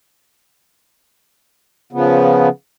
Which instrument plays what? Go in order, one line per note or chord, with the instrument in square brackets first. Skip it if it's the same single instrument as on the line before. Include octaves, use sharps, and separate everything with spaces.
[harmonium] C#3 F3 B3